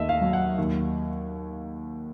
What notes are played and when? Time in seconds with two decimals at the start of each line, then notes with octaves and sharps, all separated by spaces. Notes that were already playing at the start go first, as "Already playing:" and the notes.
Already playing: D#2 A3 D#5 E5
0.09 F5
0.22 F#3
0.33 F#5
0.58 D#2